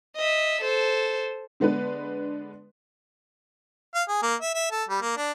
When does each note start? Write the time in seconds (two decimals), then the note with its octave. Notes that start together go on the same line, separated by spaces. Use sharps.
0.16 D#5 E5
0.61 A4 C5
1.60 D3 G#3 B3 D4 B4
3.95 F5
4.08 G#4
4.23 A#3
4.41 E5
4.55 E5
4.71 A4
4.89 G3
5.02 A#3
5.17 D4